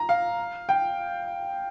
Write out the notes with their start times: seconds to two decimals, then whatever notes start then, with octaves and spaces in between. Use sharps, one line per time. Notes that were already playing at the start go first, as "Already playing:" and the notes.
Already playing: A#5
0.09 F5
0.69 G5